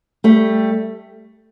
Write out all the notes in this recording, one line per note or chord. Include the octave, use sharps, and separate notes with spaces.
G3 A3